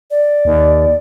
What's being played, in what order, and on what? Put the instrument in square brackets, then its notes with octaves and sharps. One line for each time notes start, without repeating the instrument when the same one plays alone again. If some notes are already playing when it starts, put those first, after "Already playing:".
[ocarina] D5
[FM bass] D#2